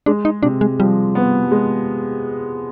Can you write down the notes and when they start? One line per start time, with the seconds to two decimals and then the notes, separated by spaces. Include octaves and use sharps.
0.06 G#3 D4
0.25 D#4
0.43 C3 D4
0.61 G#3
0.79 F3 G3
1.15 B3
1.51 G#3